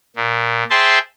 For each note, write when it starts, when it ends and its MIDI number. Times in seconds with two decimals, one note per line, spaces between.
0.16 0.64 46
0.70 0.99 68
0.70 0.99 72
0.70 0.99 76
0.70 0.99 79
0.70 0.99 81
0.70 0.99 84